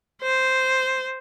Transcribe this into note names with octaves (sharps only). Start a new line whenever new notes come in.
C5